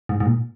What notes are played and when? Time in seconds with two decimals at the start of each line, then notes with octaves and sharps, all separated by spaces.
0.09 G#2
0.20 G#2
0.26 A#2